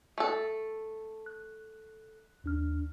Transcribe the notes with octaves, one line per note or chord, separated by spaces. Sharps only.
A3 A4
F#6
D#2 D4 F6